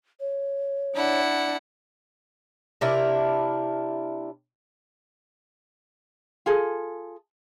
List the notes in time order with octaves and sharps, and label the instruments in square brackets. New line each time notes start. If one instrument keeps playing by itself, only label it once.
[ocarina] C#5
[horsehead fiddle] D4 [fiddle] E4 F#5
[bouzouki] C3 D4 E4 A#4
[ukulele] F4 G#4 A4